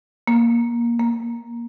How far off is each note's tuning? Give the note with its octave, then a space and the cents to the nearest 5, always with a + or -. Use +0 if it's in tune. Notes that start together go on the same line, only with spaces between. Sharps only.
A#3 +15
A#3 +15